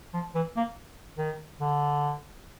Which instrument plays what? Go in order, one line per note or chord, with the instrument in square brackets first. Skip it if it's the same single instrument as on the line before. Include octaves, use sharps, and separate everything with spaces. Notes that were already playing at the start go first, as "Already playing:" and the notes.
[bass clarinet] F3
E3
A#3
D#3
D3